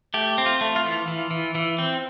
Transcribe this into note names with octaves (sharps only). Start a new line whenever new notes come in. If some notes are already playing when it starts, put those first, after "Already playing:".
A3 G4
C4
F4
A3
F4
E3
E3
E3
E3
C4